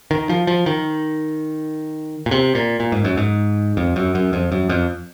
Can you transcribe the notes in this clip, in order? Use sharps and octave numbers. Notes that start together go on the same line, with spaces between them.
D#3
F3
F3
D#3
A#2
C3
A#2
A#2
G#2
F#2
G#2
F2
F#2
F#2
F2
F#2
F2